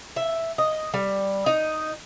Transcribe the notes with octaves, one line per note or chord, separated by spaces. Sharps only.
E5
D#5
G3
D#4